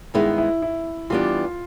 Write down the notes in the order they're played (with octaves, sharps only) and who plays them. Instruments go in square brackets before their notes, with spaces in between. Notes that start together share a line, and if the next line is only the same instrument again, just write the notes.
[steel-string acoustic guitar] G2 D#3 G#3 B3 D#4 [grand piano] E4
[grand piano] E4
E4
[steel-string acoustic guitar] E3 G3 B3 D4 G4 [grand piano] F4